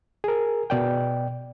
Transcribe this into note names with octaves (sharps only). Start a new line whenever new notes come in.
G#4 A#4
B2 D5 G5